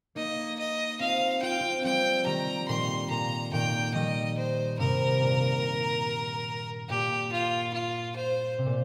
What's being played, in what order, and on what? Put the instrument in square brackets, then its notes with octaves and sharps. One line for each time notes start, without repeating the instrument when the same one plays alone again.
[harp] A#3 D#4 [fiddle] D#5
[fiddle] D#5
[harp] C4 F4 [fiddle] F5
[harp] F4 [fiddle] G5
[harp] C4 F4
[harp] G3 C4 [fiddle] G5
[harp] D#3 G3 [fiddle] A#5
[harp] A#2 D#3 [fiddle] C6
[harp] A#2 [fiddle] A#5
[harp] A#2 D#3 [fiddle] G5
[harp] D#3 G3 [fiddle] D#5
[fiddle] C5
[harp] G2 C3 [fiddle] A#4
[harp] A#2
[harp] A#2 [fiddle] G4
[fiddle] F4
F4
C5
[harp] C3
A#2